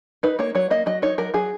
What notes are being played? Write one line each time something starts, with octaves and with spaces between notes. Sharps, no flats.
D#4 B4
A#3 C#5
F#3 C#5
A#3 D#5
F#3 D#5
D#4 C#5
F#3 A#4
F#3 G#4